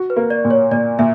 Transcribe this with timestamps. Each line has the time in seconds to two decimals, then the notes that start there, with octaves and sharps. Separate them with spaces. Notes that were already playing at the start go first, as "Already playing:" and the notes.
Already playing: F#4
0.10 B4
0.16 A#3
0.30 D5
0.45 A#2
0.51 C#5
0.71 A#2 D5
0.99 A#2 E5